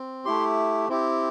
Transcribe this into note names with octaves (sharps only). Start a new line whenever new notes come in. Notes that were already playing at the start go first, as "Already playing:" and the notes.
Already playing: C4
A3 E4 G4 C6
C4 E4 G4